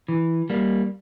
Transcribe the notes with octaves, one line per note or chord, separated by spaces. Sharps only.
E3
G3 A#3